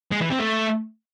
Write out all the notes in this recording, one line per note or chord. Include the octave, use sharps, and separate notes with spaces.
G#3
E3
C4
A3